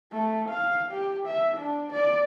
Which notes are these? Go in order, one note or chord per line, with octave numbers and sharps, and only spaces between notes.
A3
F5
G4
E5
D4
D5